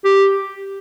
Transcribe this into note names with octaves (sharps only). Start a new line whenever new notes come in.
G4